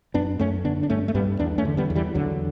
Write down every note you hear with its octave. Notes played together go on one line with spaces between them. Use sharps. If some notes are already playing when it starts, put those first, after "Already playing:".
F#2 B3 D4
F#2 A3 C#4
D3 B3 D4
D4
G2 A3 C#4
A3
G2 G3 B3
E2 B3 D4
A3 C#4
D3
G3 B3
E2
E3 G3
E2 D3 F#3